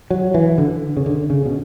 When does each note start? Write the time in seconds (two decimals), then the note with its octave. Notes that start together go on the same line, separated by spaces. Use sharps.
0.11 F#3
0.34 E3
0.58 D3
0.97 C#3
1.06 D3
1.30 C#3
1.46 B2